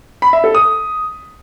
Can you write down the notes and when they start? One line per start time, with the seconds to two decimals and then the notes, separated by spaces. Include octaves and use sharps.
0.22 B5
0.33 E5
0.44 A4
0.55 D#6